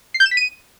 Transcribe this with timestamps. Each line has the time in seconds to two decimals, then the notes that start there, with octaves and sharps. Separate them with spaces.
0.14 C7
0.20 G6
0.26 E7
0.31 B6
0.37 D#7